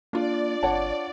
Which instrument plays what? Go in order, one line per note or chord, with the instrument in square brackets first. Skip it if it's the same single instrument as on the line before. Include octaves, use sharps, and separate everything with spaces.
[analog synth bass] A#3 [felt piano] D4 F4 [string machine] D5
[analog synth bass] G1 [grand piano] C#5 F#5 A5